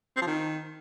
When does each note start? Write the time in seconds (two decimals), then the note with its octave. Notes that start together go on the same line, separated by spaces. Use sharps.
0.16 C4
0.21 F3
0.27 D#3